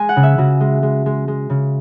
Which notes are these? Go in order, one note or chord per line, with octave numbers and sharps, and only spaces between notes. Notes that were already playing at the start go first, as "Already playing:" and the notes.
Already playing: G#3 G#5
F#5
C#3
E5
C#3 F#4
G#3
G#3
G#3
G#3
C#3